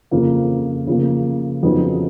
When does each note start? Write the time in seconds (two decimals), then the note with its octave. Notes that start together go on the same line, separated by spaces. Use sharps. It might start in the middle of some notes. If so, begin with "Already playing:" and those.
0.11 F2 C#3 F3 A#3
0.87 C#3 F3 A#3
1.63 F2 C#3 F#3 B3 D#4